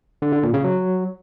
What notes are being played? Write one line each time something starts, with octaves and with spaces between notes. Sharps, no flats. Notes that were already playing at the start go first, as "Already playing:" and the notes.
D3
D3
A#2
C#3
F#3